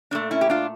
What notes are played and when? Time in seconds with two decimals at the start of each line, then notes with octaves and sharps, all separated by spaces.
0.11 A#2 A3 D4
0.31 C#4 E4
0.41 G4
0.50 D4 F4